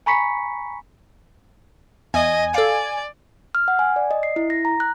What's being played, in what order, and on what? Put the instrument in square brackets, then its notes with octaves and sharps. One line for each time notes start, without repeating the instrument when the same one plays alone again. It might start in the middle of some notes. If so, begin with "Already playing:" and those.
[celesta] G#5 A#5 B5 C#6 B6 C#7
[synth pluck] E2 [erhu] D#5 [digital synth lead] G#5
[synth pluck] A4 F5 [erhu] D5
[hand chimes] F6
F#5
G#5
D5
D#5
C7
E4
A#6
A#5
F#6